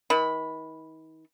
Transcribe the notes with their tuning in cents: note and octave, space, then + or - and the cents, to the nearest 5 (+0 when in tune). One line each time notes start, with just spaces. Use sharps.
D#3 +40 B5 +0